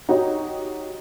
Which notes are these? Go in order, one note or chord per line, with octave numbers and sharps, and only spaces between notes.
D#4 F#4 G4 C#5